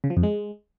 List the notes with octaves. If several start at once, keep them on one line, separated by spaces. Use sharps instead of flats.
C#3
F3
F2
G#3